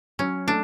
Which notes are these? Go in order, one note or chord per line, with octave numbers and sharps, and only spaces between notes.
F#3 C#4
A3 D4